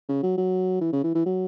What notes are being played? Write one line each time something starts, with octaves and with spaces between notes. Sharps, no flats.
C#3
F#3
F#3
E3
C#3
E3
E3
F#3